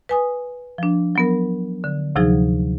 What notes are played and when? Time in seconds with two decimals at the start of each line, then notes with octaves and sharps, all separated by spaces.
0.09 B4 G#5 D#6
0.78 F3 D4
1.16 F#3 B3 A#4
1.84 D3
2.16 D2 C3 F3 F#3 D#4 G#4